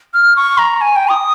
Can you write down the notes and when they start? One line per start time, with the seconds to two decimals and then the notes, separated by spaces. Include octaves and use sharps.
0.14 F6
0.36 C#6
0.58 A#5
0.81 G#5
0.96 G5
1.10 D#6